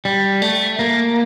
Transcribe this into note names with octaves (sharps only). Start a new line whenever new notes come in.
G3
A3
A#3